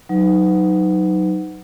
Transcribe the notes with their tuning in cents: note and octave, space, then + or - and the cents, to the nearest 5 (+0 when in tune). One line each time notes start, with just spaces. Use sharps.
F#3 +0 D#4 +5 B4 +35